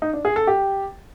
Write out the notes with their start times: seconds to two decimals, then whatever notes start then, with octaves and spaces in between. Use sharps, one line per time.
0.02 D#4
0.13 D4
0.25 G#4
0.36 A4
0.47 G4